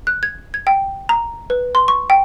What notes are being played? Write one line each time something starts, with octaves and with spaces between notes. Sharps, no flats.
F#6
G#6
G#6
G5
A#5
B4
C6
C#6
G5